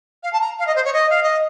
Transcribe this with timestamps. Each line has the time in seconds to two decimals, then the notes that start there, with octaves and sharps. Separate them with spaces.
0.23 F5
0.33 A5
0.41 A#5
0.59 F5
0.67 D#5
0.76 C5
0.85 C#5
0.93 D#5
1.10 F5
1.23 D#5